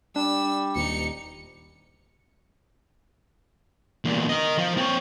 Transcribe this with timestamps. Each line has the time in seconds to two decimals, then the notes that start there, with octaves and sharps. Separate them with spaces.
0.16 G3 D4 E6
0.76 D#1 D#4 C#7
4.05 E2 A#2
4.29 A#4 D#5
4.58 F3 F4
4.77 C4 C#5